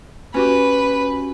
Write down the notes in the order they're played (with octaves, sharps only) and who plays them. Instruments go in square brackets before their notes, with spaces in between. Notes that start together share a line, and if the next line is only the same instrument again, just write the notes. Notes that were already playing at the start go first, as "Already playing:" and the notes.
[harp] C#4 F#4 G4 [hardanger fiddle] B4